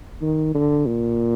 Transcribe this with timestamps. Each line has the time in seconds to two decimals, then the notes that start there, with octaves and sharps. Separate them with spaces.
0.22 D#3
0.55 D3
0.86 A#2